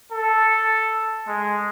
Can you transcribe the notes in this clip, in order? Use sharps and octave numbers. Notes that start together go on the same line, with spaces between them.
A4
G#3